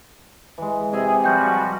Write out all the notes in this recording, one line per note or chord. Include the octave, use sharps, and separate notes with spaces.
E3 G#3
C3 G#4 D#5 E5 G#5
F3 G3 F#4 G5 G6